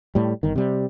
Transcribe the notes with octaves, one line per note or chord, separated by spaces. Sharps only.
A2 G3
G1 D#3
C3 G3